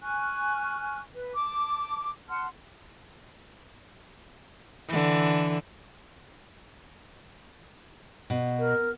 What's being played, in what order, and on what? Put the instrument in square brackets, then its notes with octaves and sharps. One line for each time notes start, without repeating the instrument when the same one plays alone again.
[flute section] G#5 C#6 F6 F#6
B4
A5 D6
F#5 A5 C6 F6
[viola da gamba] D3 E3
[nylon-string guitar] B2
[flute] A#4